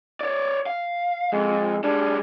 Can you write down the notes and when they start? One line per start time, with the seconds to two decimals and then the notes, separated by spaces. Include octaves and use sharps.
0.21 C#5 D5
0.66 F5
1.33 F2 G#3
1.84 G3 G#3 D4